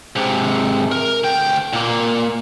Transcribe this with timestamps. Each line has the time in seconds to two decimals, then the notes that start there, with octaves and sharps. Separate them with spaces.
0.16 G#2 C3
0.91 A#4
1.24 D2 G5
1.73 A#2 A#3